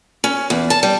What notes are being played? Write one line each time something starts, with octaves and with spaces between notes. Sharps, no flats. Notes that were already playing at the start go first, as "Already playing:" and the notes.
C#4
E2
A5
G3